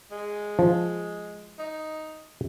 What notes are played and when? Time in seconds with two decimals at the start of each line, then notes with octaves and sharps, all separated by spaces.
0.12 G#3
0.59 F3
1.59 D#4